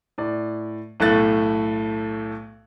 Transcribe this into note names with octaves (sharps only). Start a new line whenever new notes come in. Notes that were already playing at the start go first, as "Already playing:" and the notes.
A2 D5
B1 A2 A3 F#6 A6